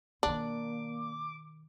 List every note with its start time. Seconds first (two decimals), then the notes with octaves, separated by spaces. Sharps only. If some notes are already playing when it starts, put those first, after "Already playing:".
0.23 B2 D#3 A#3 D4 D6